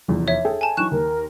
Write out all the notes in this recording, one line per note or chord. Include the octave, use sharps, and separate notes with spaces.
F1 E2 F4
C#5 E5
G#4 A4 G5
G#5 A5
E3 F#3 D#4 C#6 F#6 E7
D#2 A#4